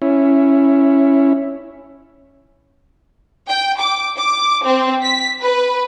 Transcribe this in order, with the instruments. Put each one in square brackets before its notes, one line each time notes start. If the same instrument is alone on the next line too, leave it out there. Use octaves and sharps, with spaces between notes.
[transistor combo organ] C#4 E4
[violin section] G5
D6
D6
C4
B6
B4